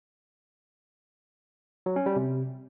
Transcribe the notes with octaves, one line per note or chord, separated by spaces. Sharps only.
F#3
C#4
G3
C3